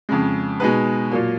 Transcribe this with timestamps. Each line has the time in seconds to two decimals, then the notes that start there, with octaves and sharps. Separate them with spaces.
0.09 F2 C#3 G#3
0.60 B2 G#3 D#4 G#4 B4
1.11 A#2 F#3 A#3